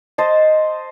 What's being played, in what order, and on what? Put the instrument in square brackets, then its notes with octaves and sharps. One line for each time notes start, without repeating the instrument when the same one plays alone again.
[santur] C5 D#5 A5